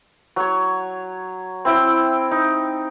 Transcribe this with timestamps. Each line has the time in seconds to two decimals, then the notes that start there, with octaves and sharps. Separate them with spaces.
0.36 F#3 C#5
1.65 C4 E4 C5 G5
2.31 D#4